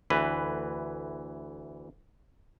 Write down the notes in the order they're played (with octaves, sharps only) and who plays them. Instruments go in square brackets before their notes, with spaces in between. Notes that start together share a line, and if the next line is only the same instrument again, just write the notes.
[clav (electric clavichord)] D2 E3 B4